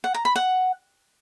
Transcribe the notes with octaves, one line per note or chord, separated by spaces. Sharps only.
F#5
A#5
B5
F#5